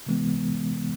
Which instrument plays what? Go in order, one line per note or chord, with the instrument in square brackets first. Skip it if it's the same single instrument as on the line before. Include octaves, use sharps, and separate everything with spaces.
[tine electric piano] C3 E3 G#3 B3